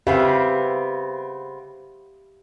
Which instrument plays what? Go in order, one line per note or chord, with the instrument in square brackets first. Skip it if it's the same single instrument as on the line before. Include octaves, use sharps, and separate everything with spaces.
[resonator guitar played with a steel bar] C#3 B3 C4 [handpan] G4 E5 F5